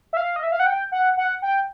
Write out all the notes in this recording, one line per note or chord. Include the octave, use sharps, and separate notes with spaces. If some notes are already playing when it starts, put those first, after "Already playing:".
E5
F5
D#5
E5
F5
F#5
G5
F#5
F#5
G5